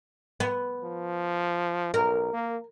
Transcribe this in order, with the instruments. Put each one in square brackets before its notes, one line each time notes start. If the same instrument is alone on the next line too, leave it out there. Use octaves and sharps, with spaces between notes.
[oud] B3
[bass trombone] F3
[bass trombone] B1 [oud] A#4
[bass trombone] A#3